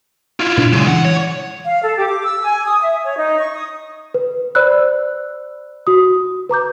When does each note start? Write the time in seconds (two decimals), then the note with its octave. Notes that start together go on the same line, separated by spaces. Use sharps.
0.40 E4 F4
0.57 A#2 D4
0.73 C#3 F#3 G#3
0.87 E3 F#5
1.05 C#5
1.64 F5
1.82 A4
1.96 G4
2.07 D6
2.24 E6
2.43 G#5
2.66 D#6
2.80 E5
3.03 C#5
3.17 D#4
3.39 C#6
3.53 D#6
4.14 B4
4.55 C5 D5 B5 E6 F#6
5.87 F#4 D#6
6.49 B4 A#5 D6 G6